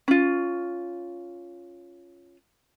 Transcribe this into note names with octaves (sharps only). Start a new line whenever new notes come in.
C#4 F4